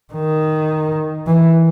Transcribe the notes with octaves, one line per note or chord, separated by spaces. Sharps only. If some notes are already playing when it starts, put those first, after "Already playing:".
D#3
E3